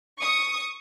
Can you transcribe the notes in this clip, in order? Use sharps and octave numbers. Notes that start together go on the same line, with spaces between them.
C#6 D#6